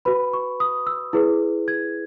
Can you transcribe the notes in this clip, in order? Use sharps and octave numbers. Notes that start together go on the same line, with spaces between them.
F#4 B4 B5
C#6
D#6
E6
E4 G#4 B4
G#6